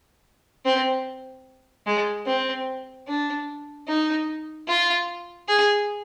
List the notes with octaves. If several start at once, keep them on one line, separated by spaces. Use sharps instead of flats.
C4
G#3
C4
D4
D#4
F4
G#4